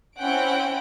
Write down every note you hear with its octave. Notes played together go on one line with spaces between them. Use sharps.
C4 C#4 E4 F#5 G5 D7